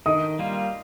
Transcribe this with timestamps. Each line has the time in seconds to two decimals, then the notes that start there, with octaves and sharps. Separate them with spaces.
0.06 D#3 D#5 D#6
0.39 G3 A#3 F4